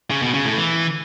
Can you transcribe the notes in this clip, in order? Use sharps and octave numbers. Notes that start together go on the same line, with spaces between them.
C#3
B2
C#3
A2
E3